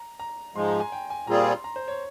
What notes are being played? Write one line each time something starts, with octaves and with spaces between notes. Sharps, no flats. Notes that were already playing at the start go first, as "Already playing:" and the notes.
Already playing: A#5
A#5
G#2 F3 G#3 C6
A#5
G#5
G5
G#5
A#2 G3 C4 F4 G#4 A#5
C6
A#5
C5
C#5